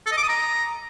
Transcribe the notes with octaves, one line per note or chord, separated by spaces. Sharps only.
A4
D#5
D6
D#6
A#5